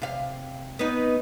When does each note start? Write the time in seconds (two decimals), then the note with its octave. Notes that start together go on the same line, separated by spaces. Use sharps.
0.02 C3 F5
0.79 B3 D#4